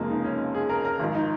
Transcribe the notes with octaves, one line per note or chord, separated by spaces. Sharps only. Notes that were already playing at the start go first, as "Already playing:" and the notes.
Already playing: F1 F2 C#3 F3 G#3 A#3
D#4
C#4
G#4
A#4
A#4
G#1 G#2 F3
D#4